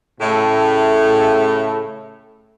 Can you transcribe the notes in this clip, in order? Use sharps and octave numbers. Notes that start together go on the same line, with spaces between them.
A2 C#3 A3